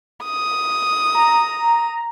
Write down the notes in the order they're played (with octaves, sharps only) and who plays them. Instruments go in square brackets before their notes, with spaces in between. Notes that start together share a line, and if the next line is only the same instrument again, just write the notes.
[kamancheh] D#6
[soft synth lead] A#5